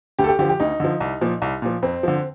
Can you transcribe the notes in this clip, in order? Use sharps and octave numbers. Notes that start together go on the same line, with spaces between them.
D2 G4
A4
G4
D3 F3 G4
G4
D2 D#4
D3 F3
C2
A#2 F3
C2
A#2 F3
F2 C4
D3 F3